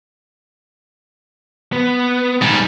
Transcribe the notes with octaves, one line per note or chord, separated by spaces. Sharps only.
B3
G#2 G3